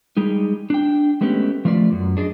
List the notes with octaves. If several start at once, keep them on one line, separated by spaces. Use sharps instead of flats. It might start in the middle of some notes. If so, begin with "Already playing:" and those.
G3 G#3 D#4
D4 G5
G#3 A3 B3 C#4 G4
F3 A3 F4 B4 D5
F#2
D4 G#4 D5 D#5